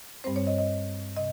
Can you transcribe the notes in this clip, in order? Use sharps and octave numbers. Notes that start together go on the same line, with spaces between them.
G2 G3 C4 C5
C#5
D#5
D#5
C3 D#5